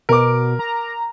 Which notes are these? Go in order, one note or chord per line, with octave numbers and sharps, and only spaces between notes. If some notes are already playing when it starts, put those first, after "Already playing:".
B2 A#4 D6
A#5